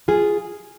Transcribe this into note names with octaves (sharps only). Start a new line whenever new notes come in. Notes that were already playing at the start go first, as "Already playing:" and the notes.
F4 G#4